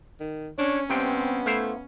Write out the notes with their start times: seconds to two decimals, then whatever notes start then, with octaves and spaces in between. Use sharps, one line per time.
0.20 D#3
0.58 C#4 D4 C#5
0.90 G2 C3 B3 C4 G5
1.46 A3 E4 C5 F5